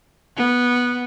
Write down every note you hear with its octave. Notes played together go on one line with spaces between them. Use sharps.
B3